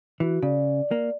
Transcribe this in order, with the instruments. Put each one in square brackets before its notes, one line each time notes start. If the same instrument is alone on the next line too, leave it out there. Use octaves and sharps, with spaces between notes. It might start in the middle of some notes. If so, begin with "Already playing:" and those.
[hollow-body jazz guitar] E3 [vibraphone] F#4
[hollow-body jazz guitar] C#3 [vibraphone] D5
[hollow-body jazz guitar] A#3